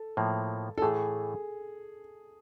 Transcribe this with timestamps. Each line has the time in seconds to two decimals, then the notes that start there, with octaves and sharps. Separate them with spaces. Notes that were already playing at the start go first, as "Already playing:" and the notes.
Already playing: A4
0.17 A2 F3 A#3
0.78 A4
0.82 A2 E3 A3 G#4